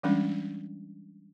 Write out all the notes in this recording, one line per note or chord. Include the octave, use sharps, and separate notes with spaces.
E3 G3 G#3 C#4 D4